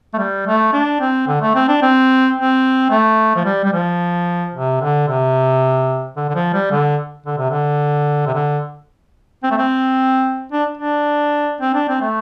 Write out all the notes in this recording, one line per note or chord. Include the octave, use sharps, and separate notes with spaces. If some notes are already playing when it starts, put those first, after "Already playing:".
A3
G3
A3
D4
C4
D3
A3
C4
D4
C4
C4
A3
F3
G3
G3
F3
C3
D3
C3
D3
D3
F3
G3
D3
D3
C3
D3
C3
D3
C4
A3
C4
D4
D4
C4
D4
C4
A3